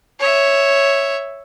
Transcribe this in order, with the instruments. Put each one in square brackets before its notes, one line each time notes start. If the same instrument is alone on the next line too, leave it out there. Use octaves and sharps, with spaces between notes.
[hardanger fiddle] C#5 E5